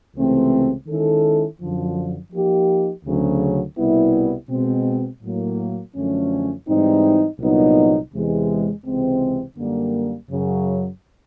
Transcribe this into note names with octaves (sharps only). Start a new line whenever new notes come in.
C#2 C3 E3 A3 C4
D#3 G#3 C#4 E4 A4
F#2 D3 F3
F3 A#3 D#4 G4
D2 C#3 F#3
C2 B2 G3 B3 E4
B2 G#3 C4
A2 F#3 A#3
F#2 D3 F3 A3 C#4
G#2 E3 G3 C4 D#4
C2 A#2 F#3 B3 D#4
E2 C3 E3 G#3
C#2 C3 E3 G#3 C4
F#2 D3 G3 A#3
F#2 C#3 F#3